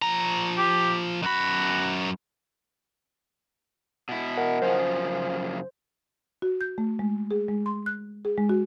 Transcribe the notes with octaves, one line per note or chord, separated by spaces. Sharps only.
F3 A#5
G4
F#2 F#4 B5
B2 E4
A#4 D#5 F#5
F#2 C#3 F3 C5
F#4
G6
A3
G#3
G#4
G#3
C6
F#6
G#4
G#3
F#4